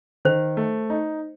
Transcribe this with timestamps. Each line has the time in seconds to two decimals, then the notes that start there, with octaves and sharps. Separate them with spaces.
0.25 D#3 C5
0.57 A3
0.90 D#4